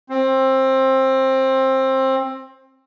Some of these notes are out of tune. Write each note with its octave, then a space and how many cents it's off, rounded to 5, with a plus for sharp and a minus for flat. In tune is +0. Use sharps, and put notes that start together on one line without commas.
C4 +20